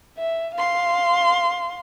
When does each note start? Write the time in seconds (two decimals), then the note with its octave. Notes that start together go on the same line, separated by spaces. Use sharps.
0.18 E5
0.54 F5 C6